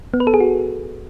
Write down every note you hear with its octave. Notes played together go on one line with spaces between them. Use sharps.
B3
B4
A4
G#4
F#4